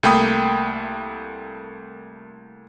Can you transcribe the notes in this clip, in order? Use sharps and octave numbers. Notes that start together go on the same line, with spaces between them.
C2 A3 A#3 G5 B5 D#6